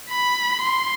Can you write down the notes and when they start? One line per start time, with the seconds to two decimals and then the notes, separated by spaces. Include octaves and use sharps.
0.09 B5
0.61 C6